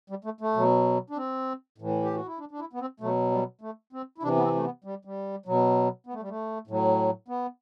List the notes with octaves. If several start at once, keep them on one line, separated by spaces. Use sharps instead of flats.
G3
A3
A3
B2 F#3
D4
C4
A2 E3
G4
F#4
E4
D4
D4
E4
B3
C4
B2 F#3 A3
G3
A3
C4
E4
C3 E3 D4
B3
C4
A3
B3
G3
G3
B2 F#3
B3
A3
G3
A3
A2 F#3
B3